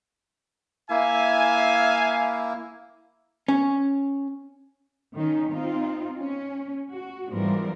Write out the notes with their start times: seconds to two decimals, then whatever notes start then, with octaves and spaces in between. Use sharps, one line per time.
0.90 A#3 E4 E5 F5 G#5
3.48 C#4
5.16 D#3 C#4 D#4
5.51 C4 D#4 F4
6.20 C#4
6.93 F#4
7.30 G#2 E3 F3 G3 C4 A#4